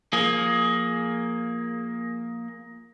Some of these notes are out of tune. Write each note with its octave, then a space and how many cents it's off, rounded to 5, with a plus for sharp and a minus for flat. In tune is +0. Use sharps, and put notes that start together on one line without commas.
F3 +0 A#3 +0 G#4 +15